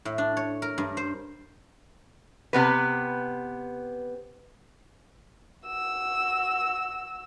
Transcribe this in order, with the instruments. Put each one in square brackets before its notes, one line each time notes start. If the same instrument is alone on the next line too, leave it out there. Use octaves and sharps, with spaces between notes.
[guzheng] A2
D4
C#5
A#4
G2
C5
[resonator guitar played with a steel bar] C3 B3 B4
[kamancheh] F#4 E6